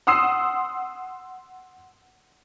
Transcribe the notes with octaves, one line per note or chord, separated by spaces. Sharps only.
F#5 C6 D#6 E6 C7